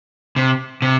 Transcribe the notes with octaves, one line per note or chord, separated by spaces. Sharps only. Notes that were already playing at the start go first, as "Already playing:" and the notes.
C3
C3